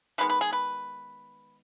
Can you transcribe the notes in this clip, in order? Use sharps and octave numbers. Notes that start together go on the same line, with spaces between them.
D#3 G#3 B3 B4
B4
G#4
B4